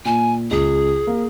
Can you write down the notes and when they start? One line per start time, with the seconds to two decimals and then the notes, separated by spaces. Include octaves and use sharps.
0.05 A#2 G#5
0.51 C#2 G#4
1.07 A#3